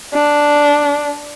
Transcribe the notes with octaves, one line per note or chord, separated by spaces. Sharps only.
D4